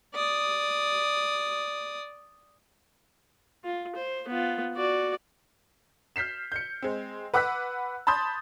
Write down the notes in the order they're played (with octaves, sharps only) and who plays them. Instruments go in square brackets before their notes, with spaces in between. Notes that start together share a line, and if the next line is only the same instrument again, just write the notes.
[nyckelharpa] D5 D#6
F4
C5
B3 F4
F#4 D5
[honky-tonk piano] F6 G6 B6 C7 E7
G6 C#7
G#3 C4
B4 F#5 D6 E6 F#6 B6
A5 B5 C6 D#6 G6 A6